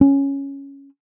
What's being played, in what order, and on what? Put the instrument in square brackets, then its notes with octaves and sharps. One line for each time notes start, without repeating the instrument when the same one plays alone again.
[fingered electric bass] C#4